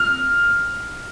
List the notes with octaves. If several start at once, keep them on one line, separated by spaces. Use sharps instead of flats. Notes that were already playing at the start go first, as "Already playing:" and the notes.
Already playing: F6